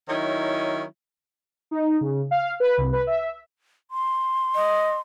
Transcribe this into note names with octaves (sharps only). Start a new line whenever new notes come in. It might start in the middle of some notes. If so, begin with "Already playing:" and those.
D#3 F#3 C#4 D#4 E4
D#4
C#3
F5
B4
C2
B4
E5
C6
D#5